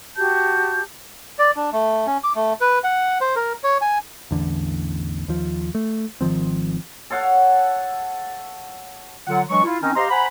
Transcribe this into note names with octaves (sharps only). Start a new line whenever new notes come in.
F#4 G4 A5 G6
D5
D4
A3
C#4
D6
A3
B4
F#5
C5
A#4
C#5
G#5
A1 E2 D3
D#2 F3
A3
G#1 D#3 F3 C4
A4 C#5 F5 F#5
D3 F#3 F4 F#5
E3 F#3 G#3 D4 C#6
E4 F4
D#3 C4 C#4 D#4
G4 C5 D#5 F5 A#5 C6
C5 F#5 G#5 A#5 B5